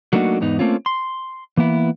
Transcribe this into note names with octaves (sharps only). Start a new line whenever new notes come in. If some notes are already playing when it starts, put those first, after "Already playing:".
F#3 A3 A#3 D4 D#4 F#4
E2 G#2 B3 D#4
A3 A#3 C4 C#4 F4
C6
E3 A#3 B3 E4